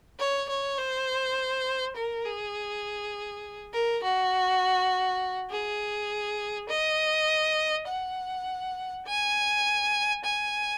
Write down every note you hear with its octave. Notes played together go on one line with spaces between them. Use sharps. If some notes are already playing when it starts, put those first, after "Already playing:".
C#5
C#5
C5
A#4
G#4
A#4
F#4
G#4
D#5
F#5
G#5
G#5